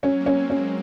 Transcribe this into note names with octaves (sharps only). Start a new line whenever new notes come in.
F#3 C#4
A#3
C#4
C4
C#4
G#3